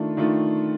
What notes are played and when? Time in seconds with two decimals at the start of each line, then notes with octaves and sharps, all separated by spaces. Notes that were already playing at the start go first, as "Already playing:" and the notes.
Already playing: D#3 A3 D4 F4
0.17 D#3 A3 D4 F4